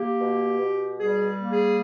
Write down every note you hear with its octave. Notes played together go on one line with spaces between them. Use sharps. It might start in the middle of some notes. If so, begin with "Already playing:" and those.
Already playing: A#3 G4
B2
B2
G3 G#4
A#3
G#4